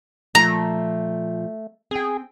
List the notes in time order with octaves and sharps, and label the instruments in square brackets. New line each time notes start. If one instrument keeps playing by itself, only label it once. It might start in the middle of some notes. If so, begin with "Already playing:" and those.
[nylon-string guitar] A#2 F3 [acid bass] A3 [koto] A#5
[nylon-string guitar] C4 G5 [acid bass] G#4